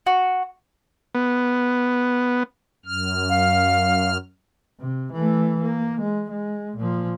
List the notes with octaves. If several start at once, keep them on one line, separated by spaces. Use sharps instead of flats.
F#4
B3
F#2 F6
F5
C3
E3 A3
A#3
G#3
G#3
A#2 F3